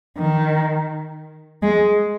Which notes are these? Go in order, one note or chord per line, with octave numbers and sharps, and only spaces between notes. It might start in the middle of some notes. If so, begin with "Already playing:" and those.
D#3
G#3